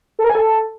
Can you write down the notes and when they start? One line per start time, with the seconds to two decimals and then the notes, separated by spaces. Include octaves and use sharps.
0.19 A4
0.24 A#4
0.30 G#5
0.35 A4